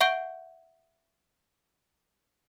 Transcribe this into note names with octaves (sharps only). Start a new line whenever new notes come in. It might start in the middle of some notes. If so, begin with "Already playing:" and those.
E5 F#5 C#6 G6 D7 G7